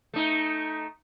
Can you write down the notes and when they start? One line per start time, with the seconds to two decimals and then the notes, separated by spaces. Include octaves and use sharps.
0.14 A3 D#4